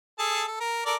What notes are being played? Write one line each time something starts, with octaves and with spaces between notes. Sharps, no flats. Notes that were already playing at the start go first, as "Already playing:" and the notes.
G#4 A4 A5
A4
A#4
A4 A#4 D5